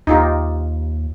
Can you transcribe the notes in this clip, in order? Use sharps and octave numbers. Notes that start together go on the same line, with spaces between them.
D#2 D#4 F4 G4